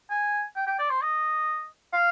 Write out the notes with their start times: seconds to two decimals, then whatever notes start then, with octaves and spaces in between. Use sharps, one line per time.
0.10 G#5
0.56 G5
0.67 G5
0.79 D5
0.90 C5
1.02 D#5
1.93 F5